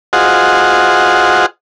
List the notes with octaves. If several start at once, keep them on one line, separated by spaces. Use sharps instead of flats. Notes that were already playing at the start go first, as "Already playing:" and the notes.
F4 F#4 G#4 C5 D#5 F#5